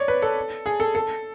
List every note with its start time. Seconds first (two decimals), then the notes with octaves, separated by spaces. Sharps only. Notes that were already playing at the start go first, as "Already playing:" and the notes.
Already playing: C#5 D5
0.08 B4
0.22 A4
0.66 G#4
0.80 A4
0.95 A4